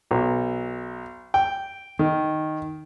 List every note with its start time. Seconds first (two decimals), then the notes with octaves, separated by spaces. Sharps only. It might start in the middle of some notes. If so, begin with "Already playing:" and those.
0.11 B1
1.34 G5
1.99 D#3